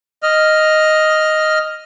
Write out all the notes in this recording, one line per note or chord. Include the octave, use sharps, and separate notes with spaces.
D#5 F6